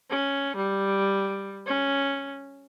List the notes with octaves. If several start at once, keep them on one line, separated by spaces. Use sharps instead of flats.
C#4
G3
C#4